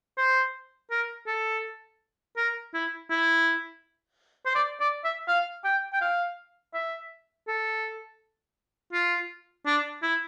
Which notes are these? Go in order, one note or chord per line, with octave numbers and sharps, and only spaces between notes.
C5
A#4
A4
A#4
E4
E4
C5
D5
D5
E5
F5
G5
G5
F5
E5
A4
F4
D4
E4